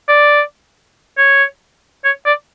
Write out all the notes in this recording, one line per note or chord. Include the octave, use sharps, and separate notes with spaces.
D5
C#5
C#5
D5